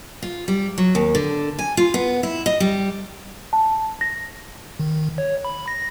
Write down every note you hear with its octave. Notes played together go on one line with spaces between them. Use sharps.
F4
G3
F#3
D#2
D3
G#5
F4
B3
E4
D#5
G3
A5
A#6
D#3
C#5
B5
A#6